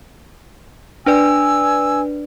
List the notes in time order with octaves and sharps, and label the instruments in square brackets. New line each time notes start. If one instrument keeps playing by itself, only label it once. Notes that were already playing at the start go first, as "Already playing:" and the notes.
[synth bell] D4 B4 D5 [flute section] G#5 E6